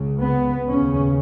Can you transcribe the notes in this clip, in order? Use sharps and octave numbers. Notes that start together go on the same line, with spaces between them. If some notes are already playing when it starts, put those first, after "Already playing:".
Already playing: C#2 C#3
B3
D#2 C#3 C#4